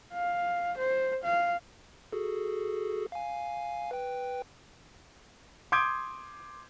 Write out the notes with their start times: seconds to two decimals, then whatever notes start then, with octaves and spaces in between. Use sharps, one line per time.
0.15 F5
0.78 C5
1.24 F5
2.12 F#4 G#4 A4
3.12 F5 G#5
3.91 B4 G5
5.72 C6 D6 D#6 G6 G#6 D7